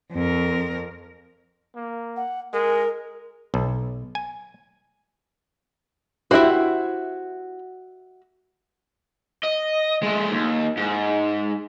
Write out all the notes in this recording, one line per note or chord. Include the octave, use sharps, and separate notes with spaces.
F2 A#4
A#3
F#5
G#3 A#4
B1
G#5
E4 F#4 G4 C5 E5
D#5
G#3 A3
D#2
G#2